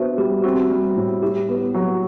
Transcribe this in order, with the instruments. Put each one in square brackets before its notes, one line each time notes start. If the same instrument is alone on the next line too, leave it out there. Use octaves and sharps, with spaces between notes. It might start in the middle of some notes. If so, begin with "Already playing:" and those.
Already playing: [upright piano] B3 D4 [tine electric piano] F#4 C5 E5
[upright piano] G3 [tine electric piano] G4
[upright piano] C4 [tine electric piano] F#4
[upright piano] G3
A2
[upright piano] E4 [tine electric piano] G4
[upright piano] B3
F#3